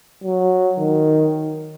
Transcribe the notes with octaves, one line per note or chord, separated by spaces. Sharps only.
F#3
D#3